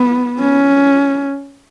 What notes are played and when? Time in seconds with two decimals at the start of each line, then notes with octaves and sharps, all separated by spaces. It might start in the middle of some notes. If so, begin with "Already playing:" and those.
Already playing: B3
0.40 C#4